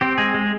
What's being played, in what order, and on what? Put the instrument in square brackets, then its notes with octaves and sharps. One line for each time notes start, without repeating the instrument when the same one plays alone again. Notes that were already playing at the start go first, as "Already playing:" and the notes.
[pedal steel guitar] C4 G4
G#3 G#4
G#3